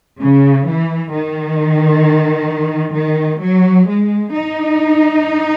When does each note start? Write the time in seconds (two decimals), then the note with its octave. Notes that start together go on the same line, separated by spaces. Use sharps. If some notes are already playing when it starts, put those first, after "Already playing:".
0.20 C#3
0.66 E3
1.12 D#3
2.96 D#3
3.41 F#3
3.88 G#3
4.34 D#4